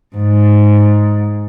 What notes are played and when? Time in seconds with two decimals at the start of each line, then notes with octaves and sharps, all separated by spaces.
0.16 G#2